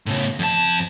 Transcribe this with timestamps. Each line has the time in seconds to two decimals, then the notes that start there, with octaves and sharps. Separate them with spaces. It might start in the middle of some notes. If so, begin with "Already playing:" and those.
0.06 A2 C#3
0.39 F2 A5